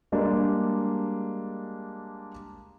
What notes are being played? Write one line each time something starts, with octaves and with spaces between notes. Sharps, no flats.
G3 G#3 A#3 D4